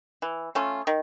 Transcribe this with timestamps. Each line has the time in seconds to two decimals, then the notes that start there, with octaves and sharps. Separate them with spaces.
0.22 E3
0.55 A3 C#4 F4
0.87 D#3